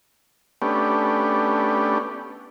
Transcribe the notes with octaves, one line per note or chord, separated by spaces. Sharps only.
A3 B3 C#4 D4 G4